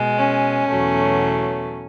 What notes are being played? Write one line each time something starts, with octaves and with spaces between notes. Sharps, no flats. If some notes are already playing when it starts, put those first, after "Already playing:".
Already playing: B2 G#3
C#4
E2 B2 F#3 A3